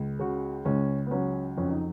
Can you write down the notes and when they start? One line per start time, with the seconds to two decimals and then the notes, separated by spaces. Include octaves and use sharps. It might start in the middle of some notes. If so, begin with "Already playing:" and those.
Already playing: C#2
0.19 C#3 F#4
0.65 C#2 C#4
1.06 B3
1.11 F#3 C#4
1.57 F2 C#4
1.69 D#4